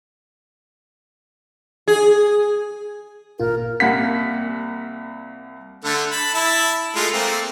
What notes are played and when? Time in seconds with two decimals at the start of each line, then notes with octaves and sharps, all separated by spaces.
1.88 G#4
3.40 G#1 A#2 F4 A#4
3.80 C2 A#3 F#5 B6
5.85 D3 A3 A4
6.11 A5 B5
6.34 E4 A5
6.96 G#3 A3 F4
7.13 A3 A#3 C4